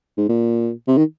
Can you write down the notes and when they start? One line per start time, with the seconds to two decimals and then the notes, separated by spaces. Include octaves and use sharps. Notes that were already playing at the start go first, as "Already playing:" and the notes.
0.18 G#2
0.29 A#2
0.88 C3
0.98 D#3